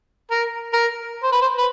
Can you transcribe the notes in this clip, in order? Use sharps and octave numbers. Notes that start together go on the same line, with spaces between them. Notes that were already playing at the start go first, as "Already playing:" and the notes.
A#4
A#4
C5
B4
C5
B4